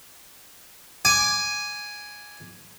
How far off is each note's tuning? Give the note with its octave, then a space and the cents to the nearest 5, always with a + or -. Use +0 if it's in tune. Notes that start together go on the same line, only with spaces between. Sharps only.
G#5 +0 D6 +0